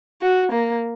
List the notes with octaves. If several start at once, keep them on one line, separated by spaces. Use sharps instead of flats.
F#4
A#3